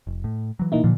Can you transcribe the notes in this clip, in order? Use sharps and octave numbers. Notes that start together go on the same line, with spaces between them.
F1
A2
E3 F#3
B2 D#3 E3 A#3 D#4 E4
A#2 D3 E3 F3